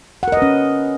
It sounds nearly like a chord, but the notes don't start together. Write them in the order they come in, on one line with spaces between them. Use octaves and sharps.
F#5 A#4 D#5 B4 C#4